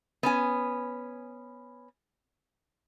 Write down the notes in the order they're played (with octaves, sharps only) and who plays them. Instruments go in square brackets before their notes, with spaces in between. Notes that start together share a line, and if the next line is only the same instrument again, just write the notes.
[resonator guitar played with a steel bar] B3 C#4 G#5